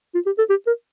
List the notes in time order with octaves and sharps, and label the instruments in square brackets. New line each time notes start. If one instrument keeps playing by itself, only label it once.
[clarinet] F4
G4
A4
G4
A#4